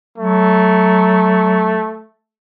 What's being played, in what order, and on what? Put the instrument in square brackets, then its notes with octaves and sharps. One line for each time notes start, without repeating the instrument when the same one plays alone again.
[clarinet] F#3 [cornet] A3